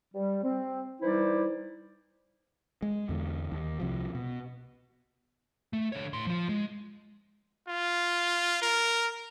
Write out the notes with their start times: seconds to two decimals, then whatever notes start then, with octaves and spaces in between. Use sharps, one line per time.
0.14 G3
0.44 C4
1.02 E3 G3 D#4 E4 C5 D5
2.82 G#3
3.09 E2 D3
3.52 D#2
3.80 C2 C3 F3
4.15 B2
5.73 A3
5.92 D3 C#5
6.13 A2 C6
6.27 F3 F4
6.49 G#3
7.68 F4
8.62 A#4